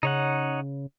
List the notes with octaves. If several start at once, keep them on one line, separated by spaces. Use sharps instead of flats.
C#3 D#4 C#5 F#5